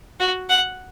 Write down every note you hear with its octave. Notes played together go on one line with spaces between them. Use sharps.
F#4
F#5